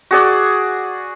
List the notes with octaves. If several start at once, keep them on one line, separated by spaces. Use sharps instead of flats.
F#4 G#4 D5 F#5